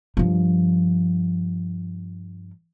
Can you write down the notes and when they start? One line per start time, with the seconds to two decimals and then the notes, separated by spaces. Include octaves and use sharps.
0.17 G2 F3